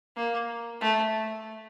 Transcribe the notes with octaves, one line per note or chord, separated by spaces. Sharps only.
A#3
A3